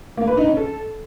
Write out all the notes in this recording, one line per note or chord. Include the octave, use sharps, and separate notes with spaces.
A#3
B4
D#4
C#4
A4